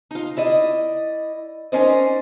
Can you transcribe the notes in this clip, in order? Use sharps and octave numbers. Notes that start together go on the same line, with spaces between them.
D#4 F4
E4 D5 D#5
C#4 D#4 A#4 C5 D5 D#5